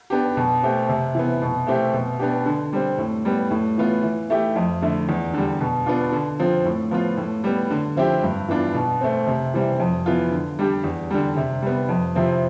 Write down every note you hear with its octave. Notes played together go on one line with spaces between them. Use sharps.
B3 D4 G4
B2
A3 C4 G4
C3
E3 B3
B2
A3 C4 E4 G4
B2
B3 D4 G4
D3
G3 C4
A2
G3 B3
A2
E3 B3 F4
E3
A3 E4 G4
F2
D3 A3 E4
E2
D3 G3
B2
B3 D4 F4
D3
F3 C4 F4
A2
F3 B3 F4
A2
G3 B3
D3
F3 C4 E4 G4
G2
E3 B3 D4 F4
B2
A3 C4
C3
E3 G3 C4
F2
E3 B3 F4
D3
G3 D4 G4
E2
D3 G3
C3
G3 B3
F2
C3 F3 C4 E4